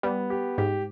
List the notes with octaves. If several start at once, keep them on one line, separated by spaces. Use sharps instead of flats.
G3 B3
G4
G#2 G4